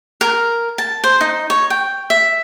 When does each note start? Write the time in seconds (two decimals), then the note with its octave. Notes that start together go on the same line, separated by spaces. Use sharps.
0.21 A#4
0.78 A5
1.04 C5
1.21 D#4
1.50 C#5
1.70 G5
2.10 E5